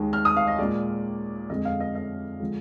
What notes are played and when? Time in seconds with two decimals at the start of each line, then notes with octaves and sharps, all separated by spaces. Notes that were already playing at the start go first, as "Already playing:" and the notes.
Already playing: D#2 D#3 G#3
0.13 F6
0.25 D#6
0.37 F5
0.47 D#5
0.58 A#2 G#3 D5
1.49 F2 D3 G#3 D#5
1.65 F5
1.80 D#5
1.95 D#5
2.40 D3 F3 G#3